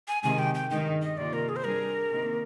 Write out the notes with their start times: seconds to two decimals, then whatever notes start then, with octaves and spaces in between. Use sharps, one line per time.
0.08 G#5
0.23 C3 D#3 G#3 G#5
0.39 G5
0.55 G5
0.70 G2 D#3 G#3 D#4 G5
1.02 D#5
1.17 C3 D#3 A#3 F4 D5
1.33 A#4
1.49 G#4
1.56 C5
1.64 G3 D4 G#4 A#4
2.11 C3 D#3 A#3